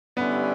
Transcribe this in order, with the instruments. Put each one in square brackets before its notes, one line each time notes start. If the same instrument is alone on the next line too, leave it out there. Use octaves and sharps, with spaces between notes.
[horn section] G2 D3 G3 C#4 E4 [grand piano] B3